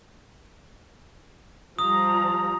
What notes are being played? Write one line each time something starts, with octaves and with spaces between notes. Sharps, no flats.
F3 G3 A#5 D#6